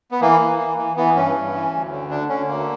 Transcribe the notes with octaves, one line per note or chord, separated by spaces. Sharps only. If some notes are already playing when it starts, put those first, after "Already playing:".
B3
E3 A#3
E3
E3
E3
E3 B3
G2 C#4
G2
E3
D2
D3
D3 D4
D3 C#4
D2 A#3